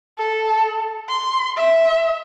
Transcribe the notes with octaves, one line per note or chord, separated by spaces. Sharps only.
A4
C6
E5